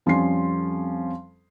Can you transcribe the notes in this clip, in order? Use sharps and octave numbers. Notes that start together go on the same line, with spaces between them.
F2 F3 G3 C#4 C6 C7